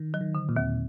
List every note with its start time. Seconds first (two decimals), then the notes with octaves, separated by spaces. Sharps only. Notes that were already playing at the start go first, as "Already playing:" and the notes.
Already playing: D#3
0.14 F#3
0.21 D#3
0.35 D3
0.49 A#2
0.56 D#2